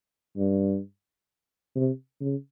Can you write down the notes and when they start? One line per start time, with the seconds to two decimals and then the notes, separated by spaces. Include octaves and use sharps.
0.37 G2
1.75 C3
2.21 C#3